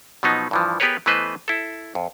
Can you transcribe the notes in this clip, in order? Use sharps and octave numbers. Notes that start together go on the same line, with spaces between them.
B2 F3 F#3 B3 D#4
G2 E3 F3
B3 G4 G#4 A#4 B4 C#5
E3 A3 B3 B4 C5 D#5
E4 A4
F2